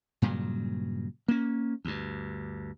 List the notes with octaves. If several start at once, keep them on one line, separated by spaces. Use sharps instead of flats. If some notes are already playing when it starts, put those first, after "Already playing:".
G2 A#2 C#3 F#3
A#3 C#4
D2 G2